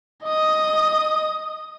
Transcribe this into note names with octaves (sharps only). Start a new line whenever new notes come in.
D#5 D#6